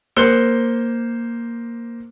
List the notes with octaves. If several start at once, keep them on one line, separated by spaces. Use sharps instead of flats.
A#3 C5 F#6 C#7 G7